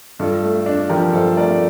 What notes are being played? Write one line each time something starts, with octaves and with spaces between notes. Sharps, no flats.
G2 F4 A4
A3
D4
F3 G4 A#4
G2 A4 C5
A3 A#4 D5